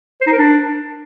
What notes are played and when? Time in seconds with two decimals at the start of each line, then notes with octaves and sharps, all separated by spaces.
0.21 C5
0.27 D#4
0.32 A#4
0.38 D4